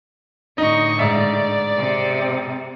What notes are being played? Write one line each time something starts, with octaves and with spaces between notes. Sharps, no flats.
A2 D3 D#4 D#5 C#6
G#2 D5 E5
C3